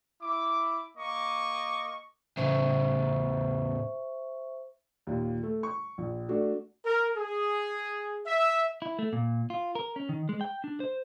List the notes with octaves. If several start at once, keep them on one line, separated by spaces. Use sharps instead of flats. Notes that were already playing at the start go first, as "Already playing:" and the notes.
E4 D6
A#3 D#5 C#6 D6
A2 C#3 C5 E5 C#6
D#2 A#2
A3
C#6
A#1
A3 D4 F#4
A#4
G#4
E5
E4
A3
A#2
F4
A#4
C#4
D#3
G#3
G5
D4
C5